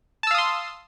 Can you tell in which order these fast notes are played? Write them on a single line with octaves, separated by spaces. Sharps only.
A5 E6 F5 D#6 C6